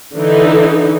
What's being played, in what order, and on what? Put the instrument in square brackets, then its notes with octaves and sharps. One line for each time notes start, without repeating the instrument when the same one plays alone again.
[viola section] D3 E3 D#4